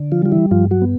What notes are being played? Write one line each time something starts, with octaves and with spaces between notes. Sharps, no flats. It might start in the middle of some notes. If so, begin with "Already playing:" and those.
Already playing: D3
F3 F4
G3 F4
E3 E4
G2 F3 F4
F#3 F#4
B3